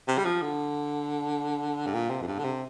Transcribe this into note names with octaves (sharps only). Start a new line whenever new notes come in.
C3
G3
F3
D3
G2
A#2
C3
F2
G2
D3
C3